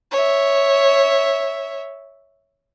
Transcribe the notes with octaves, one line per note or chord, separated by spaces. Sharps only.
C#5 E5